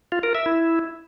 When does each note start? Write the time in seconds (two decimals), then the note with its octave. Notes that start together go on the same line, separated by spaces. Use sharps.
0.12 F4
0.23 A#4
0.35 E5
0.46 E4